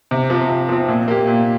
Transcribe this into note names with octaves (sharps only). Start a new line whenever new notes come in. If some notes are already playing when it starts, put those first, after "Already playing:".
C3
F3 C4
C3
F3 C4
A#2
A#3 G4
A#2